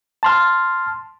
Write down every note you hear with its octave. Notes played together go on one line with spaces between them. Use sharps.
A5 C6 F6